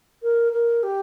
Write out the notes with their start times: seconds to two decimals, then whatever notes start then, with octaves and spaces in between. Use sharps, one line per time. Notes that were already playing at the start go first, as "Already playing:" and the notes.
0.23 A#4
0.53 A#4
0.83 G4